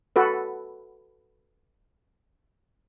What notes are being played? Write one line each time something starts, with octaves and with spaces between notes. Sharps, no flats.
F#4 A4 B4